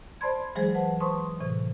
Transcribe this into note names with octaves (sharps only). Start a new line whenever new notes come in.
C5 D5 A5 B5 C6 G#6
E3 F#3 G#3 G#4 C5
B4 C5 F#5 A5
B4 C5 A5 C6 C#6 D#6
A2 C3 E3